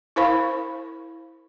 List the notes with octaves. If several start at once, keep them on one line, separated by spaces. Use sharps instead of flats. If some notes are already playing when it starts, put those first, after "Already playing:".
E4 A#4 C5 F5 B5 C#6